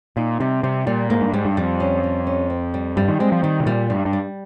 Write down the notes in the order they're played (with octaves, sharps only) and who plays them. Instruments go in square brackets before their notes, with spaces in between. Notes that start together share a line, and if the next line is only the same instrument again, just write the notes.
[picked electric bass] A#2 [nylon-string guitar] D#4
[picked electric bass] C3 [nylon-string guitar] G3
[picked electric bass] C3 [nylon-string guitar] G3
[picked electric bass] A#2 [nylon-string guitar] G3
[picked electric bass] G#2 [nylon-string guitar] A#3
[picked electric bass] G2
[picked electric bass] G#2 [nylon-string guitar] G3
[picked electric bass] G2
[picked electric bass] F2 [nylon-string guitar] G3
[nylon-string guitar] C#4
G3
C#4
C4
G3
[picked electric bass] G2 [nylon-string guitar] G3
[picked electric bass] D#3
[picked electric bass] G#3 [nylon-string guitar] C4
[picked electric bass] F3
[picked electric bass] D#3 [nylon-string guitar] G3
[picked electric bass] C3
[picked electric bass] A#2 [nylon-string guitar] G3
[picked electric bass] G2 [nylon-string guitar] G3
[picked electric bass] G2
[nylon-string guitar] G3